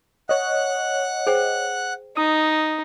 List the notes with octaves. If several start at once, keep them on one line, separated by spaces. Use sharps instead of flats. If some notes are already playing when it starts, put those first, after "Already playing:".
C#5 D#5 F#5 F#6
G#4 C5 G5
D#4 D#6